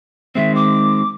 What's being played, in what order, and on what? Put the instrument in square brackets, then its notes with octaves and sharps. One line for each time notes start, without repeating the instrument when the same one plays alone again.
[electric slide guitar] D#3 G#3 C4 [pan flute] E5
[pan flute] D6